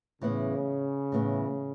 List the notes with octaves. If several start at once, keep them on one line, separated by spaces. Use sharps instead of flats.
A2 C#3 E3 B3
A2 E3 B3